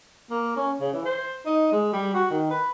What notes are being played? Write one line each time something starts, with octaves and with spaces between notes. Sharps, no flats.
A#3
C#4
C#3
E3
C5
D#4
G#3
G3
F#4
D#3
B4